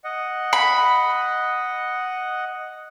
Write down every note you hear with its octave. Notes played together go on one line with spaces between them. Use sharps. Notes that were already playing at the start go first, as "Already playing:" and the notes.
D#5 F#5
B5